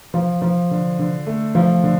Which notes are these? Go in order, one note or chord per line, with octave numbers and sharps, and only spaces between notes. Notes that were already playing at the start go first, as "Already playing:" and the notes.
F3
F3
D3
D3
A3
F3
D3